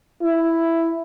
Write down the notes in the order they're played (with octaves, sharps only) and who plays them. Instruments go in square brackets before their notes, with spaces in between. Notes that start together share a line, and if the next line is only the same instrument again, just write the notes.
[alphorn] E4